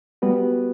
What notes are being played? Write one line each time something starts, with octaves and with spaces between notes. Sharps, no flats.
G3 B3 F#4 B4